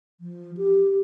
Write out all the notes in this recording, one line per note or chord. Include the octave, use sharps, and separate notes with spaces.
F3
G4